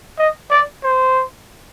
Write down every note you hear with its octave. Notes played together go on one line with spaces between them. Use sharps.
D#5
D5
C5